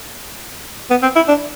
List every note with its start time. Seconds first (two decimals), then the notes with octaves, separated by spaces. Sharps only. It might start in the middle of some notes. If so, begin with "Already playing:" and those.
0.90 B3
1.02 C4
1.16 E4
1.28 D4